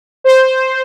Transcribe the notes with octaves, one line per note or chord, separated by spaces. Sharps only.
C5